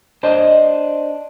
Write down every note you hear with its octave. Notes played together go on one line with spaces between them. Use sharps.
D4 C5 D#5